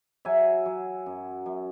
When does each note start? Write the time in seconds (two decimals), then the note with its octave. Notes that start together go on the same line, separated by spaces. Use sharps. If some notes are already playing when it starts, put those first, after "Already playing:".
0.25 F#3 E5 G#5
0.66 F#3
1.06 F#2
1.46 F#2